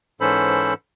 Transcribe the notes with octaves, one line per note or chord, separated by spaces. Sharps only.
G#2 E3 C#4 A4 C5 B5